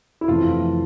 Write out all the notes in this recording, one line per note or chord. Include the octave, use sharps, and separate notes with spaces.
E4
F2 C3 E3 A3 F4